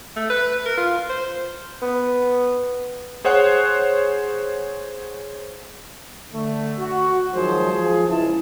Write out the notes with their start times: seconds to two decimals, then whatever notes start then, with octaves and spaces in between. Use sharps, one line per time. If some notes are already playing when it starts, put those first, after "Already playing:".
0.16 A3
0.30 B4
0.66 A#4
0.77 F4
1.10 C5
1.82 B3
3.25 G#4 C5 C#5 F#5 F#6
6.33 D3 A3
6.79 F#4
7.34 D#3 F3 F#3 G#3 G#4 C5
7.72 F3 G#4
8.08 C#2 E4 A5